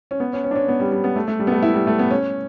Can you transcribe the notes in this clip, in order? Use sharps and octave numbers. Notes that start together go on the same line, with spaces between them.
C#4
B3
C#4
C#4
D4
C#4
B3
G3
G3
B3
A3
A3
G3
B3
A3
E4
G3
A3
B3
C#4